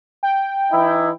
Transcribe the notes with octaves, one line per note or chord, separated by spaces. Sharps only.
G5
E3 D#4 E4